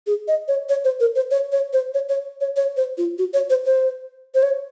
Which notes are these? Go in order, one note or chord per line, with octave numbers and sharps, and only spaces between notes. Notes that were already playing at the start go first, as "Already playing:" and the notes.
G#4
D#5
C#5
C#5
C5
A#4
C5
C#5
C#5
C5
C#5
C#5
C#5
C#5
C5
F4
F#4
C#5
C5
C5
C5
C#5